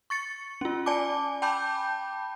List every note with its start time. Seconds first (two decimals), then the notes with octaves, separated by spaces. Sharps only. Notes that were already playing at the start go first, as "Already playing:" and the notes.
0.10 C#6 A6 C#7
0.61 C#4 F4
0.86 D5 G#5 A5 D6
1.42 G5 A5 B5 D6 G6